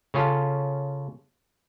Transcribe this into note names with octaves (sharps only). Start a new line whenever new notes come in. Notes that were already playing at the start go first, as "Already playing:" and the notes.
C#3 C#4 F4 A4